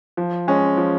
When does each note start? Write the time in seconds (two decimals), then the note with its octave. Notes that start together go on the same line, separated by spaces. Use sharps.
0.17 F3
0.48 G#3 C#4
0.77 F3